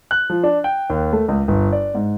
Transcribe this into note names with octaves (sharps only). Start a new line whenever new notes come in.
F#6
F3
D4
G5
D#2
A3
C#2
G1
D5
G#2